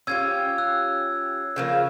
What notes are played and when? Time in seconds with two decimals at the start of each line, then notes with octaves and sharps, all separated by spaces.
0.07 C#4 F4 G4 E6 G#6
0.58 E6 F#6
1.56 C#3 F3 A#3